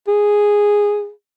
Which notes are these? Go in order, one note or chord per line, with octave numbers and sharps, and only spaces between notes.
G#4